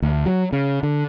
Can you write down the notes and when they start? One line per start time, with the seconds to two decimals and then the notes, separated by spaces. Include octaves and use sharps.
0.02 D2
0.26 F#3
0.53 C#3
0.83 D3